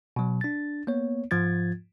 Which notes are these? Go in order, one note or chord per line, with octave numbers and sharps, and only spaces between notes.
B2 F#3
D4 A6
A#3 B3 C#5
G#2 F3 F4 G#6 A6